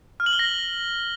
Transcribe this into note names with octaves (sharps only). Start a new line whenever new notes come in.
F6
F#7
G7
A#6